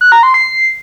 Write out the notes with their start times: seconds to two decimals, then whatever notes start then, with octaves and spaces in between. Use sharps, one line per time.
0.01 F#6
0.12 A#5
0.23 C6
0.34 C7